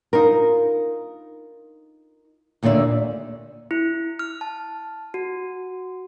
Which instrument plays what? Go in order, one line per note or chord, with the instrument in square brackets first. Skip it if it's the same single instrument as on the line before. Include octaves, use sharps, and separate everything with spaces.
[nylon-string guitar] D#4 F4 A#4
D#2 A#2 D3 D5 E5
[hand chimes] E4
F6
A5
F#4